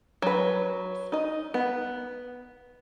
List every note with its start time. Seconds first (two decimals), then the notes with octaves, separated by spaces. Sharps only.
0.22 F#3 B4
1.12 D#4 D#5
1.54 B3